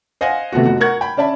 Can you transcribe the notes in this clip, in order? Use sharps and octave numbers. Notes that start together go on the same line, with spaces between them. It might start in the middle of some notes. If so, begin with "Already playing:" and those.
C5 D#5 F5 F#5 G#5
C3 A3 B3 F#4
F1 F#4
A#4 F#5 C#6 G#6
G5 B5
C#4 D5 E5 A5 B5